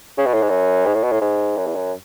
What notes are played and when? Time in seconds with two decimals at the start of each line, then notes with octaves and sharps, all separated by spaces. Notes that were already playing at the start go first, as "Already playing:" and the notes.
0.18 C#3
0.26 B2
0.34 A2
0.42 G#2
0.49 F#2
0.86 G#2
0.95 A2
1.03 B2
1.12 A2
1.21 G#2
1.57 F#2
1.66 E2
1.75 F#2